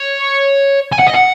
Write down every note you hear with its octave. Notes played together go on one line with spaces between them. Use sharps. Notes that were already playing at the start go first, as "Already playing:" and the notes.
Already playing: C#5
G#5
F#5
D#5
F#5